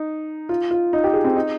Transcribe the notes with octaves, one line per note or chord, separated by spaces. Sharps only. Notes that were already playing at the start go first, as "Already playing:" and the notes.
Already playing: D#4
F4
F4
D#4
G4
G#4
C4
D#4